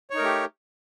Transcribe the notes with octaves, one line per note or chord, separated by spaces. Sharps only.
A3 D#4 G4 A#4 C#5